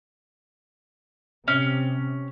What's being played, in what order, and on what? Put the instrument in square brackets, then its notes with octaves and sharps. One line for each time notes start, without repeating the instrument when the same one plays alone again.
[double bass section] C3 [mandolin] C#4